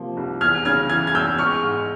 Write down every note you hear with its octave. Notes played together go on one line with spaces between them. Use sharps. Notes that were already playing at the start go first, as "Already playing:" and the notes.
Already playing: C3 F3 A#3
C2
E2 F6 G#6
C#3 F6 G#6
E3 F6 G#6
G#6
E2 E6 G6
G#3 C#6 F6
G#2